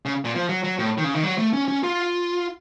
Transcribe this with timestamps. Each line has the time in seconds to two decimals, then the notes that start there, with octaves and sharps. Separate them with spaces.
0.05 C#3
0.25 A#2
0.36 F3
0.49 F#3
0.64 F#3
0.79 A2
0.98 D#3
1.04 C#3
1.14 D#3
1.23 F#3
1.38 A3
1.53 C#4
1.68 C#4
1.84 F4